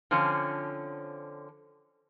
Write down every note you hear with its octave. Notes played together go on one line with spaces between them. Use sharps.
D3 F3 C4 C#4